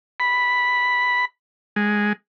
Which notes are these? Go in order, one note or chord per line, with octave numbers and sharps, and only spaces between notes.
B5
G#3